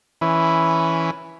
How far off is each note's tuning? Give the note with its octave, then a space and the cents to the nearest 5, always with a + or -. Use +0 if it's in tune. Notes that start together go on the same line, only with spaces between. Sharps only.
E3 +0 C#4 +0 E4 +0